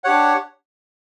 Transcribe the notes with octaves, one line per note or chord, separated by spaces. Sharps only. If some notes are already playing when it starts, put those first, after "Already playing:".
D4 G4 C#5 F#5